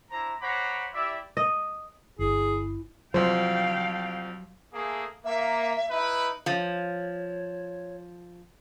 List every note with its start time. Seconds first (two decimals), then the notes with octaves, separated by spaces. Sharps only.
0.10 D4 E4 C5 A#5
0.41 C5 C#5 F#5 A#5 B5 D6
0.94 E4 G4 D5 E5
1.37 D#5
2.19 G1 E4 G#4
3.14 C2 F3 F#3 C5 F5 G5
4.74 A3 A#3 G#4
5.25 A#3 E5
5.90 D#4 E4 B4
6.46 F3 C#5